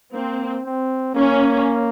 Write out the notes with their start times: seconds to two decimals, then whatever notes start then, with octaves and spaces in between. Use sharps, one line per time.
0.13 A#3 C4
0.64 C4
1.15 A#3 C#4